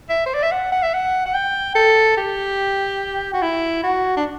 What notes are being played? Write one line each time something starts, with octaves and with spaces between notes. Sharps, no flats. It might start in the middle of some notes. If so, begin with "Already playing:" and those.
E5
C5
D5
E5
F#5
F#5
E5
F#5
F#5
G5
A4
G4
F#4
E4
F#4
D4